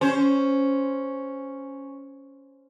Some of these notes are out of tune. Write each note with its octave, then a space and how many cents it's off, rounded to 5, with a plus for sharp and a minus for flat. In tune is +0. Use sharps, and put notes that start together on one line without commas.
C#4 +0 C5 +0